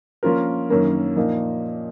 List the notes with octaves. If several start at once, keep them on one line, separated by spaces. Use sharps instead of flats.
F3 A#3 C#4 F4 A#4
F#2 D#3 A#3 C#4
A#2 F3 A#3 D#4